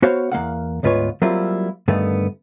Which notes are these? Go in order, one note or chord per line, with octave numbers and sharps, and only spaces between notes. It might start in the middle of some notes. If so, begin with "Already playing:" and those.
B3 F#4 C5 C#5 F5
E2 A#3 F5 F#5
D2 G#2 B3 F4 B4 C#5
F#3 G3 A#3 C4 E4 F4
G2 D3 D#3 A3 B3